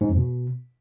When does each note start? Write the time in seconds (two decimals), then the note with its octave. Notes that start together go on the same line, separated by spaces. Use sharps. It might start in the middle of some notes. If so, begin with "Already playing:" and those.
0.01 G#2
0.09 F2
0.17 B2